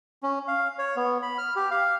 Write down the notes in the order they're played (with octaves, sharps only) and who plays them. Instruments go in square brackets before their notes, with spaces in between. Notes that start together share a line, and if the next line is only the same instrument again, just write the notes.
[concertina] C#4
F5
C#5
B3
B5
F6
G4
F5